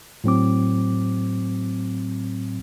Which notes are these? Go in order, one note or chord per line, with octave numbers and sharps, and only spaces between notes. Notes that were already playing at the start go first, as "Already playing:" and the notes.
A2 F#3 C4 D6